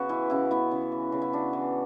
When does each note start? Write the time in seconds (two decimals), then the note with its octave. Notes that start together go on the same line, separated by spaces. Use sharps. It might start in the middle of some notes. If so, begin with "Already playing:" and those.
Already playing: C#3 B3 F#4
0.09 E3 E4
0.30 C#3 E4
0.51 B3 E4
0.71 C#3
0.92 E3
1.12 C#3
1.22 E4
1.33 D4 F#4
1.53 E3